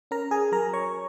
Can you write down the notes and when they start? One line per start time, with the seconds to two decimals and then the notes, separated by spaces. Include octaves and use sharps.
0.11 C#4 A#4 A#5
0.31 G#4 G#5
0.52 F#3 A#4 A#5
0.73 C#5 C#6